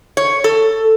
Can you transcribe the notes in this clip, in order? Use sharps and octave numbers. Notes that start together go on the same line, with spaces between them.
C#5
A4